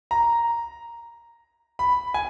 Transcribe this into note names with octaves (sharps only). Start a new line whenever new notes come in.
A#5
B5
G#5